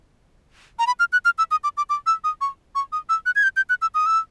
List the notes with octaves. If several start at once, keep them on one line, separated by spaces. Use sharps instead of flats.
A#5
B5
F6
F#6
F6
E6
D#6
D6
D6
D6
E6
D#6
C#6
C#6
D#6
E6
F#6
G#6
G6
G6
F#6
E6
D#6
E6